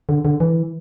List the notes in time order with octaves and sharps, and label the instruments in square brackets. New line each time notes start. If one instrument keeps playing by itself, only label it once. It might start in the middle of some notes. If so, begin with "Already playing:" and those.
[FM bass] D3
D3
E3